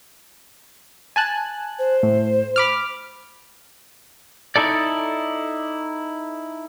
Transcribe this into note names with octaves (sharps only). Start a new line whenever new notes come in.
G#5 A5 F#6
C5
A2
B5 D6 F6
D#4 E4 A4 D5